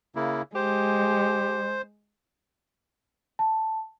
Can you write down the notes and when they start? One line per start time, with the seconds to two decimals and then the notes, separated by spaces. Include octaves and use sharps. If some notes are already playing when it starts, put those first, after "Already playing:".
0.15 C#3 A#3 E4
0.55 G#3 G4 C5
3.39 A5